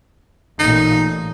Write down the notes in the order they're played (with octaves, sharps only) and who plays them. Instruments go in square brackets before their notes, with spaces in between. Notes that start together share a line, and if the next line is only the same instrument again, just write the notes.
[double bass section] A1 A#2 [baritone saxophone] D#4